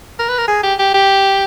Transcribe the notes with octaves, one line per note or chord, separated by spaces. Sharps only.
A#4
B4
A#4
G#4
G4
G4
G4